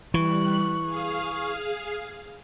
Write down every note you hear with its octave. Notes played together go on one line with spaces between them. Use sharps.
E3 G3 C#6 F#6
G#4 F5